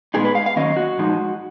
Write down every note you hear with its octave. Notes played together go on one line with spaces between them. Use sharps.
A#2 G#3 B3 D#4 G#4
B4
F5
F5
D#3 F#3 A#3 C#4 D#5
F#4
A#2 F3 G#3 D#4